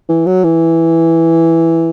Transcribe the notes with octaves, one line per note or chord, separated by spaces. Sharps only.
E3
F#3
E3